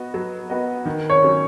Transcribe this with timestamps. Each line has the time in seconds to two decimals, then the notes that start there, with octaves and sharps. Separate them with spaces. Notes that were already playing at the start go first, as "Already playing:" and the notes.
Already playing: B3 F#4 D#5
0.14 F#3
0.50 B3 F#4 D#5
0.85 D#3
1.10 C#5
1.23 F#3 C#4